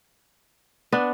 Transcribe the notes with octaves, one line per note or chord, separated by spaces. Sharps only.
B3 D4